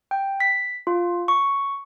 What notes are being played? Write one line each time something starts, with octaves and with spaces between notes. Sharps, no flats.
G5
B6
F4
C#6